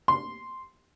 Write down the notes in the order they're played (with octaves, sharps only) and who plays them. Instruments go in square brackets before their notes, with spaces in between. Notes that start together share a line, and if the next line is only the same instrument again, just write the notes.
[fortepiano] C6